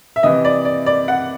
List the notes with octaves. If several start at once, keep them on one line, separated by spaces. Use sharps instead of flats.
E5
C3 E3 D#5
D5
D5
D5
F#5